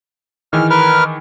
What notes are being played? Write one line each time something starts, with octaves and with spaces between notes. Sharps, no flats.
D#3 E3 G#4 F6
A#4 B4 F6